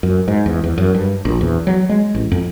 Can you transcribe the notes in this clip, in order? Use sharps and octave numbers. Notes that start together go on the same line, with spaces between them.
F#2
G#2
E2
E2
F#2
G2
A#1
E2
F#3
G#3
A1
F2